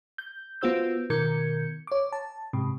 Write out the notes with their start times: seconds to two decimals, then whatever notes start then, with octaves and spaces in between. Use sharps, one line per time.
0.18 G6
0.61 B3 F4 F#4 C5 E6 G6
1.10 B2 D#3 A#4 G6 G#6 C#7
1.87 C#5 D6
2.12 A5
2.53 G#2 C3